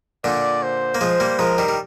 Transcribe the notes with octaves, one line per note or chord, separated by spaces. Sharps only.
A#2 D3 D5
C5
A#3
F3 G#3 C5
G3 A#3
F3 G#3 A#4
D#3 G3
G3